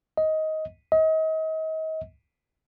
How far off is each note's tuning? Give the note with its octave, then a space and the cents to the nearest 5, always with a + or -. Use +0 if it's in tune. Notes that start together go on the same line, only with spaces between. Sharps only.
D#5 +15
D#5 +35